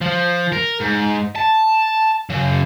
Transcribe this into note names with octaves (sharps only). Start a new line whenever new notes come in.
F3
A#4
G#2
A5
C#3 F#3